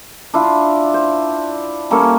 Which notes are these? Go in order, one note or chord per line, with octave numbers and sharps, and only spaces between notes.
D4 E4 F4
C5
G3 A#3 C#4 A4